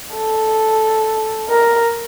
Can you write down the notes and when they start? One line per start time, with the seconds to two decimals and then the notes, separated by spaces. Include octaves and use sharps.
0.15 A4
1.49 A#4